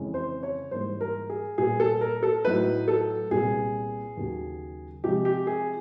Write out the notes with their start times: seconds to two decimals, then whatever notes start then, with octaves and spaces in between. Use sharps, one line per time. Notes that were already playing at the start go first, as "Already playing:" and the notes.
Already playing: F2 C#3 E3 G#3 C#4
0.14 C5
0.43 C#5
0.71 G#2 E3 G3 A#3 C5
1.01 A#4
1.30 G#4
1.58 A#2 G3 B3 G#4
1.80 A4
2.01 A#4
2.23 A4
2.44 A2 F#3 B3 D#4 B4
2.88 A4
3.31 C2 A#2 G3 B3 G#4
4.17 D#2 C#3 F#3
5.04 C3 F3 G#3 G4
5.25 G4
5.47 G#4